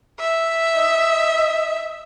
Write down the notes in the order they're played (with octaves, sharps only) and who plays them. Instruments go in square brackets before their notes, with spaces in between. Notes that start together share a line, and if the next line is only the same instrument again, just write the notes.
[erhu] E5
[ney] D#5